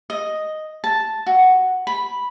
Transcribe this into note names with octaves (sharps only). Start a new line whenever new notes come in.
D#5
A5
F#4
B5